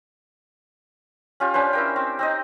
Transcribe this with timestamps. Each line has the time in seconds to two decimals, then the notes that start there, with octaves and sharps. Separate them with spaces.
1.40 C#4 F4 G4
1.54 C#4 D4 B4 C5
1.73 E4 A#4 G5
1.96 C4
2.19 C4 D#4 D#5